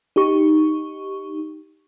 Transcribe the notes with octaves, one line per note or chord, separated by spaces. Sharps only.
D#4 G4 C#6